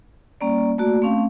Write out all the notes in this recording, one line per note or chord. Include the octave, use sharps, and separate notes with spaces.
G3 A#3 C#4 D5
A3 A#3 F#4 D5
A3 C4 C#4 F5